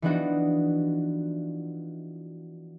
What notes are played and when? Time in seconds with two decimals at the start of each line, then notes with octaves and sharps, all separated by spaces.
0.02 E3 F3 B3 D4 D#4 F#4